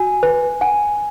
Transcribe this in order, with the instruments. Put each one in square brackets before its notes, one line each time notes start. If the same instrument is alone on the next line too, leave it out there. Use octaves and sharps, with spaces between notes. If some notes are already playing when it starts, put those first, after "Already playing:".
Already playing: [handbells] F#4 [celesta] G#5
[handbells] B4
[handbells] F#5 [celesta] G#5